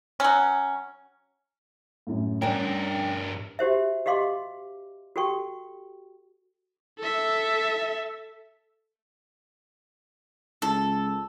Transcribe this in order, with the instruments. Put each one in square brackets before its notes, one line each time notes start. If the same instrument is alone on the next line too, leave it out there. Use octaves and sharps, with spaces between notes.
[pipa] F#3 C#4
[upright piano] F#2 A2
[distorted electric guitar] G2 A#4 [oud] C#4 D4 [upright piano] G5
[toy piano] F#4 G4 C5 E5
G4 D#5 F5 C6 D6
F#4 G4 A4 G5 C#6
[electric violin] A4 E5
[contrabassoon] C#2 [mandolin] A4